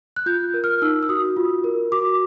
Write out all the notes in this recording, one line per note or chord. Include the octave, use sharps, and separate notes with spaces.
F#6
F4 G6
A#4
F6
D#4 E6
E6
F#4 D#6
F4
A#4
F#4 D6